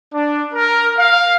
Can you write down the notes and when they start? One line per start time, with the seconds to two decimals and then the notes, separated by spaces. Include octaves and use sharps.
0.14 D4
0.54 A#4
0.98 F5